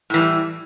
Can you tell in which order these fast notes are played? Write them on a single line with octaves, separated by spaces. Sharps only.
A2 E3 G3